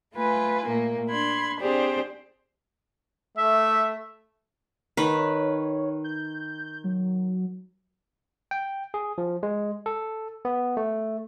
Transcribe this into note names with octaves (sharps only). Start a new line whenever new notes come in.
A3 F4 B4 G#5
A#2 A3 A#3
D4 B5 C6 G#6
C4 D4 G4 G#4 C5 D5
A3 E5
D#3 B4 C#5
G6
F#3
G5
G#4
F3
G#3
A4
B3
A3